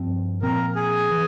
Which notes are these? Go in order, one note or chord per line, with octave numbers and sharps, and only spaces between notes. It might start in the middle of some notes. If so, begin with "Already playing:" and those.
Already playing: G2 F3 C4
A#2 F3 C4 A#4
G#4
E3